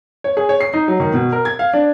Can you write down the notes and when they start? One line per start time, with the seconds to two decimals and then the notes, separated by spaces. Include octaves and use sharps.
0.24 C#5
0.37 G#4
0.49 C#5
0.61 C7
0.74 D#4
0.88 F#3
1.00 D#3
1.14 B2
1.32 A#4
1.45 G#6
1.59 F5
1.73 D4